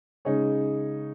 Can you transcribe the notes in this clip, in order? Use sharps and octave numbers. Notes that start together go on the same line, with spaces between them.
C#3 G#3 D#4 G#4 C#5